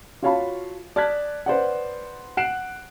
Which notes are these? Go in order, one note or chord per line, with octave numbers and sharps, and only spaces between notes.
F4 F#4 C#5 F5 A5 B5
D5 A5 F6 F#6 G#6 B6
B4 C5 D5 F#5
F#5 F#6 C7 D7 E7